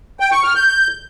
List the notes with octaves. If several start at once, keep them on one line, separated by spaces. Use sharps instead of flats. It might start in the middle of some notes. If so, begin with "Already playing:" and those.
G5
C#6
F6
G6